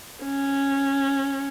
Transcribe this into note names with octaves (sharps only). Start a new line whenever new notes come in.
C#4